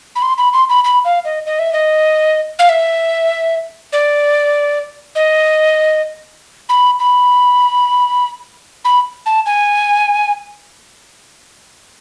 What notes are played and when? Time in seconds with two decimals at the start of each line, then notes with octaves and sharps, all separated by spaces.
0.15 B5
0.22 C6
0.38 B5
0.53 C6
0.69 B5
0.84 B5
1.05 F5
1.25 D#5
1.46 D#5
1.59 E5
1.73 D#5
2.59 F5
2.69 E5
3.92 D5
5.15 D#5
6.69 B5
6.99 B5
8.85 B5
9.26 A5
9.46 G#5